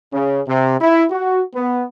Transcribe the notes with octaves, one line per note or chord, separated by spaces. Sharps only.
C#3
C3
E4
F#4
B3